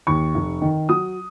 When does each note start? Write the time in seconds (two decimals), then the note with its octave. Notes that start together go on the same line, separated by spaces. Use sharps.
0.07 D#2 C#6
0.35 F1
0.62 D#3
0.89 F#3 D#6